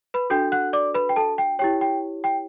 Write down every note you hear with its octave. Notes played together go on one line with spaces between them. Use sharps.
B4 B5
D4 F#4 A4 G5 G6
F#5 F#6
D5 D6
B4 B5
G5
A4 A5
G5
E4 G4 C#5 G5
G5
G5